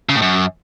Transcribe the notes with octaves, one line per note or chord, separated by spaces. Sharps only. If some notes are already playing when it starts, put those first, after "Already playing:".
C#3
A2
F#2